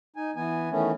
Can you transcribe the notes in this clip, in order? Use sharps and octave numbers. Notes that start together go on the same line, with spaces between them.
D#4 G#5
E3 B3 G#5
D#3 E3 A3 B3 C#4